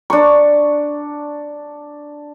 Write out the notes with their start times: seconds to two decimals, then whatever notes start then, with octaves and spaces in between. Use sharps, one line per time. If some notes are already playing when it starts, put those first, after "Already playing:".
0.10 D4 C#6